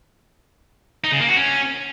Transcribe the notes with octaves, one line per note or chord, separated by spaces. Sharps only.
D#4
C#3
A#3
F#4
C#4